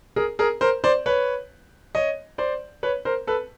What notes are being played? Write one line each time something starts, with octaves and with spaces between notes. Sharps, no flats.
G#4 A#4
G#4 A#4
A#4 C5
C5 D5
B4 C#5
C#5 D#5
C5 D5
B4 C#5
A#4 C5
A4 B4